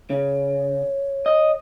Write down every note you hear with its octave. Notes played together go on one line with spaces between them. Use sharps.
C#3 C#5
D#5